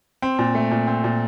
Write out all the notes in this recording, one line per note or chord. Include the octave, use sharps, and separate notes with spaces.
C4
A#2
A3
A#2
C4
A#2